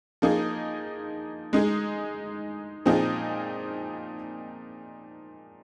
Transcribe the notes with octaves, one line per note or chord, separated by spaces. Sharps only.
F3 A#3 D#4 G#4
G#3 D#4 G#4
A#2 F3 C4 D#4 G#4